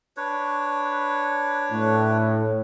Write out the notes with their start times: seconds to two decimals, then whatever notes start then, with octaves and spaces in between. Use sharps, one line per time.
0.17 D4 B4 C#5
1.72 A2